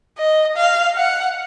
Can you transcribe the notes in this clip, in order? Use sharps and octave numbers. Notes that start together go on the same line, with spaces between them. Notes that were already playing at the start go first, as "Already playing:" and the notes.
D#5
F5
F#5